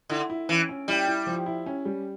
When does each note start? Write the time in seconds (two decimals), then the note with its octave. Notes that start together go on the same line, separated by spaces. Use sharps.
0.09 D3 E4
0.30 E4
0.49 E3 C#4
0.69 C#4
0.88 G3 E4
1.07 E4
1.27 F3
1.46 E4
1.66 C#4
1.85 G3